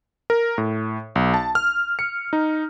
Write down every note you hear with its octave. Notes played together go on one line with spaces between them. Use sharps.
A#4
A2
B1
A5
F6
C#7
D#4